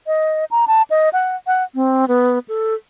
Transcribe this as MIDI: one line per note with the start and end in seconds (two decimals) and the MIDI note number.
0.07 0.45 75
0.51 0.65 82
0.68 0.82 81
0.90 1.09 75
1.13 1.36 78
1.47 1.64 78
1.75 2.05 60
2.08 2.39 59
2.48 2.74 69